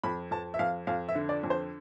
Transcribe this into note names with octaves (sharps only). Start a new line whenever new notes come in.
F2 B5
F2 A5
E5
F2 F5
F2 F5
E5
D3
D5
F2
C5